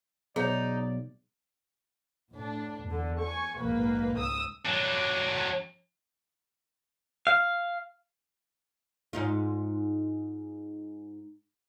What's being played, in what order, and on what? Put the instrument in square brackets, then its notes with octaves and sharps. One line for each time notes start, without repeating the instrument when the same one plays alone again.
[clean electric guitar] B1 [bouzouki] D#4 [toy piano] G#4 C#5 [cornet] D5
[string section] A2 D4
E2 D3
G#5 C#6
A#1 G#2 A#3 B4
C#2 D#6 E6
[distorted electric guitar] F#3 D4
[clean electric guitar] F5
[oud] G#2 D#4 F4